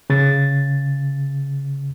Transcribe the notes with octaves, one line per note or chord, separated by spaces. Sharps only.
C#3 A6